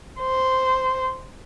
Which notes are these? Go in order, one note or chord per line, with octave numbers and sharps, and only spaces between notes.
C5